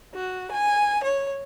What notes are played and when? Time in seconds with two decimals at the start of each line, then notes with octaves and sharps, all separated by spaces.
0.15 F#4
0.51 G#5
1.03 C#5